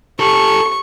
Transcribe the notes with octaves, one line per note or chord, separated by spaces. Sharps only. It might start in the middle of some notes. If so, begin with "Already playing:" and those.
G4 A4 C#6